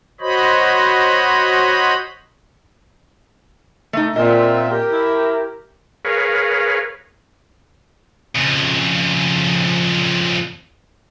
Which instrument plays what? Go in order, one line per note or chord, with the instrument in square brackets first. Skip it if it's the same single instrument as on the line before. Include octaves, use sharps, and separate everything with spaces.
[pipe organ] F#4 C5 C#5 D#5 B5
[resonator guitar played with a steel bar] A3 D#4
[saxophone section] A#2 [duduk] C4 [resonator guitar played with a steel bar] D#5 [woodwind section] E5
[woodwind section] G4 [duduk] A#4
[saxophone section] E4
[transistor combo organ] G#4 A#4 B4 C#5 F5
[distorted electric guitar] F2 C#3